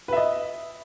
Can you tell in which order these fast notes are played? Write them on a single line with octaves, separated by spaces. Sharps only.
B4 E5 D#5